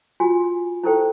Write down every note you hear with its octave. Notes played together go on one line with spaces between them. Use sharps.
F4 F#4 G#5
D#4 E4 G4 A4 C5 G5